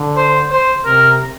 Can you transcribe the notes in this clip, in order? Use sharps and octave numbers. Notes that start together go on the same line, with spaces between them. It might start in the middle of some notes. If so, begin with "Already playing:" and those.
Already playing: D3
C5
C5
C3 A#4